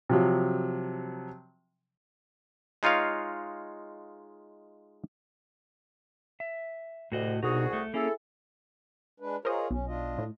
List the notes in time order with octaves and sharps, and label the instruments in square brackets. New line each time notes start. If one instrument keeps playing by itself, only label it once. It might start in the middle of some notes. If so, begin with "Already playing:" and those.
[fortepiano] C3 F3 F#3
[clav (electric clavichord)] G#3 D#4 F4 C#5 F5
[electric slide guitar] E5
[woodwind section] D2 C3 [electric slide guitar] A2 F#4 D#5
[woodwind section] C2 F#4 G#4 [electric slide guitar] B2 D#4
[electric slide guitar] A3
[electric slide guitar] A#3 C#4 [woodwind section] E4 G#4 A4
[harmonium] G#3 D4 B4
[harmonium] F4 G#4 C#5 [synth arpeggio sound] A#4 C5 D#5
[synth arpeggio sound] B1 [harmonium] C#4
[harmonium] D4 F4 D#5
[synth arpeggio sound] A2